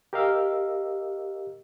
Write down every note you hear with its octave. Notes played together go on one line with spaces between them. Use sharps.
G4 A#4 D#5 F5 E6